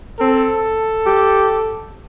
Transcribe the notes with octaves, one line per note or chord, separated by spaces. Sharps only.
C4 A4
G4